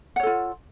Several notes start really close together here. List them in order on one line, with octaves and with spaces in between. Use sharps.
F#5 C#5 A4 F4